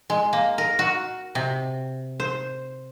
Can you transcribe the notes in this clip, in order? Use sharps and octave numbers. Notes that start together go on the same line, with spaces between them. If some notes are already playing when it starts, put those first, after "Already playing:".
G#3
A#3
A#4
F#4
C3
C5